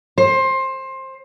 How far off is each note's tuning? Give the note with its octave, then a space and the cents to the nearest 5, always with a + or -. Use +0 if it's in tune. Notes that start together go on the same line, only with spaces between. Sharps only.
C5 +20